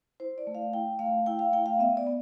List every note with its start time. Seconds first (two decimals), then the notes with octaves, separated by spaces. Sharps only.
0.20 E4 C5
0.38 D5
0.47 A3
0.55 F5
0.73 E4 G5
0.99 A3 F5
1.26 E4 G5
1.39 F5
1.52 A3 G5
1.66 F5
1.79 B3 E5
1.97 D5
2.07 B3